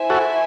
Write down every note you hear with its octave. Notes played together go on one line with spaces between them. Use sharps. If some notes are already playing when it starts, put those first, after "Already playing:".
Already playing: E4 C5 E5 G#5
F#4 A4